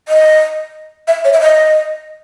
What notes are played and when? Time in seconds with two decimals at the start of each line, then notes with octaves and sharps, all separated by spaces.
0.08 D#5
1.08 E5
1.25 C#5
1.33 E5
1.41 D#5